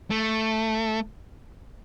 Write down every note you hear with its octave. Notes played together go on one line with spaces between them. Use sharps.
A3